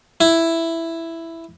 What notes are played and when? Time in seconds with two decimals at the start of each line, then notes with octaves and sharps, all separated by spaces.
0.21 E4